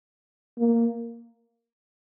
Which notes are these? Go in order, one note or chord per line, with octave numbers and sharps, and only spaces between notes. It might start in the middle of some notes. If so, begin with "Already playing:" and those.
A#3